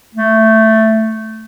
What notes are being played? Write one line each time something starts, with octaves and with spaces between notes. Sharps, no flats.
A3